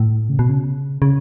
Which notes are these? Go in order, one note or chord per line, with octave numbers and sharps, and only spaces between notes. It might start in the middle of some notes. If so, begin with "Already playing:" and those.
Already playing: A2
C#3
B2
C#3
C#3